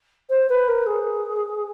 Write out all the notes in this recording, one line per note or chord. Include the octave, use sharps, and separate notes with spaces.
C5
B4
A#4
G#4